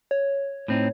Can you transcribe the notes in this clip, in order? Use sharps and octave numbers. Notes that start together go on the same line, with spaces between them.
C#5
A2 C4 D#4